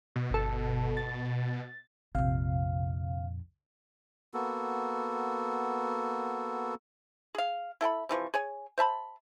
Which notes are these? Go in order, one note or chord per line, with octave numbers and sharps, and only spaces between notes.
B2
G1 A4
A6
A#1 F2 C3 F5
A#3 B3 F#4 A4
G#4 F5
E4 A4 G5 B5
C3 E3 F3 C#6
G#4 C#5 G#5
C5 E5 A5 B5